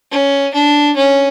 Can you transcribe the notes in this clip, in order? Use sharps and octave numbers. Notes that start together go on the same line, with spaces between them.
C#4
D4
C#4